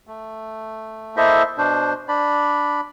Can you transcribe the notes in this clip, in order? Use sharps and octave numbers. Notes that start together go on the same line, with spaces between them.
A3
A#3 E4 A4 C5 D#5 E5
B2 D4 C5
D4 D5 B5